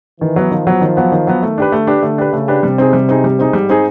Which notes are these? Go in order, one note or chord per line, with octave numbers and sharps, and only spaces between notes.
D#3 E3
F#3 B3
D#3 F3
F#3 B3
D#3
F#3 B3
D#3
F#3 B3
D#3 A3
D4 G4 B4
D3 A3
D4 G4 B4
D3 A3
D4 G4 B4
C#3 A3
D4 G4 B4
C3 G3
C4 D#4 G#4
G3
C4 D#4 G#4
G3
C4 D#4 G#4
G#2 G3
C4 D#4 G#4